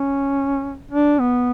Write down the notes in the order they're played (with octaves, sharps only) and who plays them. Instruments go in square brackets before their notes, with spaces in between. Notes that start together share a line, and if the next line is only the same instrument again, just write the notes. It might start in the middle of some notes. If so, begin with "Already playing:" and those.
Already playing: [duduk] C#4
D4
B3